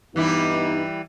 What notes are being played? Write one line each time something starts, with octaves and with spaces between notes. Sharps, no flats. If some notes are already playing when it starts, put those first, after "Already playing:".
G2 E3 G3 B3 D#4 E4